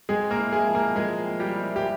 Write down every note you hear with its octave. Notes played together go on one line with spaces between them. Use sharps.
G#3 C4 G#4
A#3 A#4
E4
G#3 G#4
F3
A#3 A#4
F3 G#3 G#4
C4
G3 G4
E4
G4